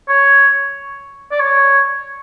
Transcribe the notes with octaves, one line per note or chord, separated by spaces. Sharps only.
C#5
D5
C#5